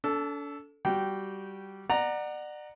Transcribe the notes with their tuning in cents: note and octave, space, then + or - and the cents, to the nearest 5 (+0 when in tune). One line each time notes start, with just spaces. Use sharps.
D4 -40 A4 +0
G3 -10 F#4 +0 G5 -15
D5 +35 F#5 +0 A#5 +0